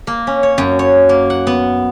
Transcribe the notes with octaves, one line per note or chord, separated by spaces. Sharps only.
A#3
C#4
C#5
F#2
C#5
A#3
F#5
B3